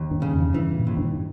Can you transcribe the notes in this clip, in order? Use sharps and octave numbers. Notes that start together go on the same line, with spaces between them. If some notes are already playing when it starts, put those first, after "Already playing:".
Already playing: D#2
G2
C#3
E2
G2 E3
A#2
D#2
G2